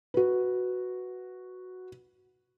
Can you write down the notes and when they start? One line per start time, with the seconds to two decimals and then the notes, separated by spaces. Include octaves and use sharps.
0.14 F#4 B4